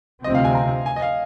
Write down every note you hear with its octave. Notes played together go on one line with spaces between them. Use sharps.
D2 C3 F3 C4 D#5
F5
G#5
A#5
G#5
D#5
F5